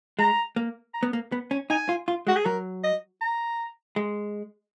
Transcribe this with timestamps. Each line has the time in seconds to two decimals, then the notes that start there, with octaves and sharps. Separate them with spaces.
0.19 G#3 A#5
0.56 A#3
0.94 A#5
1.03 B3
1.13 A#3
1.32 B3
1.51 C#4
1.70 D#4 G#5
1.89 F4
2.08 F4
2.27 G#3 F#4
2.36 G#4
2.45 F#3 A#4
2.84 D#5
3.21 A#5
3.96 G#3